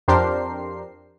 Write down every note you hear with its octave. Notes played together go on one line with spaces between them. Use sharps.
F2 D4 G4 A#4 C5 C7